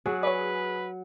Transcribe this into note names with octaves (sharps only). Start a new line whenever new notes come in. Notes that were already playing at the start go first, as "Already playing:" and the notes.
F#3 G#4
B4 C#5 D5